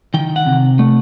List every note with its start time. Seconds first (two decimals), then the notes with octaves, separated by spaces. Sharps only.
0.14 D#3 G5
0.36 F#5
0.46 C3
0.79 A3